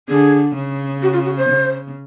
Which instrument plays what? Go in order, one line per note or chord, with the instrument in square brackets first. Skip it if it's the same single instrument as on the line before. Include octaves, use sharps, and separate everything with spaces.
[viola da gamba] D3 [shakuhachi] G#4
[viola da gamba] C#3
[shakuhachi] F#4
F4
F#4
C5
[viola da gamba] C#3